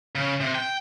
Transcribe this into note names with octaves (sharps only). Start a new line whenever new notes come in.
C#3
C3
G5